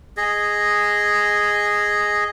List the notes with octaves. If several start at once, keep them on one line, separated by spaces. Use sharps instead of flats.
G#4 D#5